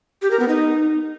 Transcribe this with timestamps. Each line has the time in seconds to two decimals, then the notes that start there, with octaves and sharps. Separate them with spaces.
0.22 G4
0.31 A#4
0.40 B3
0.48 D#4